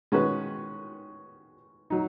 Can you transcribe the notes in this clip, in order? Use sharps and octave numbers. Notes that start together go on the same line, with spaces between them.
D#3 G#3 C#4 F#4 B4
F#3 D#4